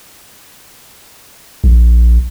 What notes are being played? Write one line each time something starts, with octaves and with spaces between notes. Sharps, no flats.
A#1